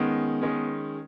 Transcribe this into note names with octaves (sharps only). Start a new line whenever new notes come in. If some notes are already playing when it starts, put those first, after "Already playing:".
Already playing: D#3 G#3 B3 C#4
D#3 G#3 C#4